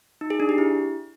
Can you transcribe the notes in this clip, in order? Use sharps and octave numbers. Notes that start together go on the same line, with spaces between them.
D#4
G#4
D4
G4
E4